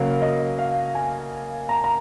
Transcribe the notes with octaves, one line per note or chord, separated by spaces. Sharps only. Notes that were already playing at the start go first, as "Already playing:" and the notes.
Already playing: C#3 F#3 A#3 F5
D#5
F5
G#5
A#5
A#5